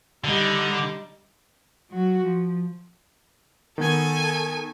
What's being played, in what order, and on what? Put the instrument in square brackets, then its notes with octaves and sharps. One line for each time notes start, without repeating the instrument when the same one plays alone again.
[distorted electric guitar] D3 [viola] G3 D#4
[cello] F#3 F#4
F3
[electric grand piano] D#3 B3 G#6 [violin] A4 G#5